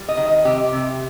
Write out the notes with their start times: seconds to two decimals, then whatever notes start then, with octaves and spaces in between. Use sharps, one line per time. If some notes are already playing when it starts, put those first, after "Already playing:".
Already playing: G3
0.09 D#5
0.17 D#3
0.26 D#5
0.45 C3 G4
0.72 C3